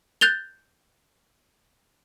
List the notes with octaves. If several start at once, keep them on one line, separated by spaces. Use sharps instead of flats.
F#6 G6 A6 F7 G7